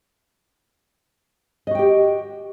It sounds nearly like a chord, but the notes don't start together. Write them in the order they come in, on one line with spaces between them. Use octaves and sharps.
D#5 F#4 G5 G4